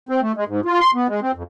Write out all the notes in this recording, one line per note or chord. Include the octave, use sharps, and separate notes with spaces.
C4
A3
G#3
G#2
F4
C6
B3
G#3
C4
F2